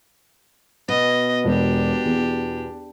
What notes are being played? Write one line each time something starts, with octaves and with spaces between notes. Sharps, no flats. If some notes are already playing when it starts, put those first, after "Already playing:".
B2 D#5
E1 D4 G4
E2